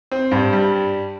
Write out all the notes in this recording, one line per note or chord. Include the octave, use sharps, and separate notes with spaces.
C4
G2
G3